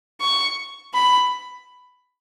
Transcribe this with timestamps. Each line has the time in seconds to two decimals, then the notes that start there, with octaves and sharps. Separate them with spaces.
0.21 C#6
0.94 B5